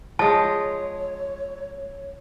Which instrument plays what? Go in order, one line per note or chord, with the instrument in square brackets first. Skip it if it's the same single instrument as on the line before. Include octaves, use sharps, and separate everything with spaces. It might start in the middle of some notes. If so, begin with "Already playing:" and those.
[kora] F3 G#3 [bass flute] C#5 [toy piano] A5